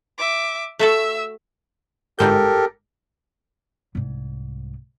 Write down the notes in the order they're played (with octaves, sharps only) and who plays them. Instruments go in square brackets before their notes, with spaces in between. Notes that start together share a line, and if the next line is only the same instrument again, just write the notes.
[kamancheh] E5 D6
[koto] A3 F#4 A4 [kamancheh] E5 E6
[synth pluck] G1 G#2 G6 [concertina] G4 A4 A#4
[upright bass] C2 G#2